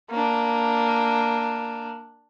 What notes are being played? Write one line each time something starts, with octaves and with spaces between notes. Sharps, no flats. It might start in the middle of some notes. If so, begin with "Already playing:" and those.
A#3 D4